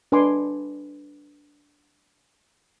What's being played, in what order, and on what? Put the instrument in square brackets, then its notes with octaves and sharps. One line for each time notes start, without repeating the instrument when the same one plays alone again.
[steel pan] D4 B4 D#5 G#5 C6 D6